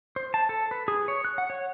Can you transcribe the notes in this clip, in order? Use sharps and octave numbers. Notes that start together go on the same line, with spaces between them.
C5
A5
A4
B4
G#4
C#5
F#6
F#5
C#5